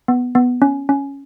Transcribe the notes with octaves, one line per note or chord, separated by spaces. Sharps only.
B3
B3
C#4
C#4